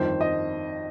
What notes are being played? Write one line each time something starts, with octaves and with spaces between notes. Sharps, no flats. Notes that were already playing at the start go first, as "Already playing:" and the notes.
Already playing: G1 F2 D#3 C5
D#5